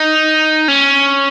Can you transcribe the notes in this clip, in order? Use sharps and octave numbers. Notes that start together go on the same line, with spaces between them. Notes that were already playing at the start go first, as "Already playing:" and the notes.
Already playing: D#4
C#4